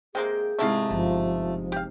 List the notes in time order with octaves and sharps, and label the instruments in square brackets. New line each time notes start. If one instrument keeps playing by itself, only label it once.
[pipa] C3 G#3 A#3 [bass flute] G#4 [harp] G5
[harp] G#2 C3 D#4 [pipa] A3 E4 F5
[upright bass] G1 [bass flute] F3
[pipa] G4 F5